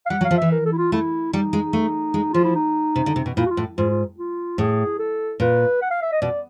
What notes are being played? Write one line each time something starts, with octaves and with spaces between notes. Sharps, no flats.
F5
G3 F#5
F#3
F5
F3
E3 E5
A#4
A4
E4
F4
A3 E4
G3 D#4
G#3
A3
G#3
F3 F4
E4
D#4
C3
D3
C3
B2
A#2 E4
F#4
F4
A2
G#2 F4
F4
F4
A2 G#4
A4
A#2 B4
F#5
F5
E5
D#5
B2 D5